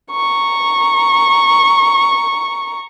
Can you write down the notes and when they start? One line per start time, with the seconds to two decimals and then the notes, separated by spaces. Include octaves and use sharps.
0.12 A#5 C#6